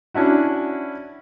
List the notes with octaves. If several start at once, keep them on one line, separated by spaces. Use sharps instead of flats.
C#4 D4 E4 F#4